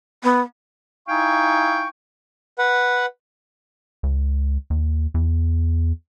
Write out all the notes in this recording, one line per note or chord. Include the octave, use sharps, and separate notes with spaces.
B3
D#4 E4 F5 G5 G#5 C#6
B4 F#5
C#2
D#2
E2